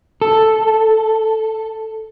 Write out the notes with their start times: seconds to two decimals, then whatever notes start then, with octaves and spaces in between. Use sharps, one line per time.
0.21 A4